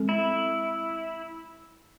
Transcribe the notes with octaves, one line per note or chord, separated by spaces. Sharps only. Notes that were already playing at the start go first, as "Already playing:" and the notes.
Already playing: G#3 C4 A4
E4